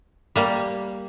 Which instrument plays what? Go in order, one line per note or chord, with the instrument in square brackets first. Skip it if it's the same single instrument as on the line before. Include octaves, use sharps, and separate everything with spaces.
[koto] G3 A#3 G4